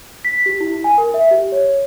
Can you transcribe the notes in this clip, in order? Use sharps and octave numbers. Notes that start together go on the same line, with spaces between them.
B6
G4
E4
G#5
A#4
E5
G4
C#5